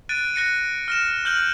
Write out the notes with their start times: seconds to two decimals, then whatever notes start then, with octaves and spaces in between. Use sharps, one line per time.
0.09 F#6 A6 D7 D#7
0.34 F#6 A#6 C#7 D#7
0.88 F6 A#6 E7
1.25 F6 G6 F#7